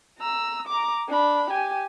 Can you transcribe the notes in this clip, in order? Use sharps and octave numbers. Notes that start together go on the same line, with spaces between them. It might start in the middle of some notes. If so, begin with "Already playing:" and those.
A#5 E6
A#5 D6
D4 B5
G4 G#5